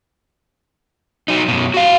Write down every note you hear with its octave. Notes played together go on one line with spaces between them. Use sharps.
F#3 D#4
F#2 B2
F#4 F5